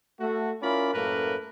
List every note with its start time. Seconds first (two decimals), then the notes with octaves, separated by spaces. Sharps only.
0.19 A3 F#4
0.62 C#4 E4 F4 A#4 D5 B5
0.94 F#2 A2 A3 A#3 A#4 B4